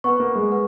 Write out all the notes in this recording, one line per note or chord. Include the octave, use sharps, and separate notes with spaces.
B3 B4 F#5 C#6
A#3
G#3
B4 F#5